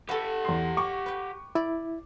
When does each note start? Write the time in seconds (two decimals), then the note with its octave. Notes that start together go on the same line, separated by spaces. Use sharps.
0.09 G4 A4 B4 F#5
0.45 E2 C6
0.77 C#6 D6
1.06 B4 G5
1.55 E4 D5